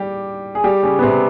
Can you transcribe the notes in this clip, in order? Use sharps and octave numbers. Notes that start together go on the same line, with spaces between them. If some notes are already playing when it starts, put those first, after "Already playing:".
Already playing: G3 G4
G#4
G3 G4
C#3 C#4
B3
C3 C4